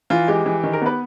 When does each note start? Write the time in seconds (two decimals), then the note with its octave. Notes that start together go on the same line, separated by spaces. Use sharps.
0.10 E3 F4
0.28 G#3 G4
0.46 E3
0.63 D#3
0.73 A#4
0.82 B3 B4